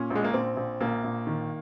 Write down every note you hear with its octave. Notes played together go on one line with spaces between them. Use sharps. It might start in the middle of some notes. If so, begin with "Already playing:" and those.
Already playing: A#2 C#4
A#1
G#3
A#3
A#1 C4
A#1
A#1 A#3
A#1
D#3